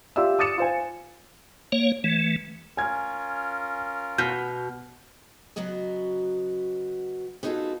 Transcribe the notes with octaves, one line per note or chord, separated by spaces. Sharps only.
F4 G4 D5 E5 E6
D6 D#6 A6 C#7 E7
F4 C5 G#5
A#3 C#5
E3 A3
C#4 F4 A#4 G#5 F6 G#6
B2 F6 G6
C#3 F#3 B3 F#4 D#5
B3 D#4 F4 F#4 G#4 A4